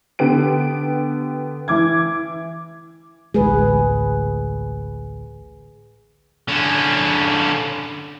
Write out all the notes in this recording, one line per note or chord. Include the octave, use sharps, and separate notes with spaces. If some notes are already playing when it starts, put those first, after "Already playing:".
D3 B3 G4 D7
E3 D6 G#6
A1 D2 G#3 G#4 B4
D3 C#4